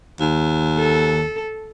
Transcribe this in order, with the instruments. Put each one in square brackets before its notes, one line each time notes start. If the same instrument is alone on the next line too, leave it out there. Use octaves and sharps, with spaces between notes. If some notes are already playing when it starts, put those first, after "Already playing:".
[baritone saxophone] D#2
[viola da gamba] A4